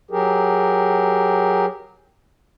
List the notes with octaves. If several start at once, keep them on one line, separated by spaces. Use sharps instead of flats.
F#3 G4 G#4 A#4